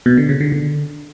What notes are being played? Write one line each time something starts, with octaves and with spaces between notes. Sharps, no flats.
B2
D3
C#3
D3
D3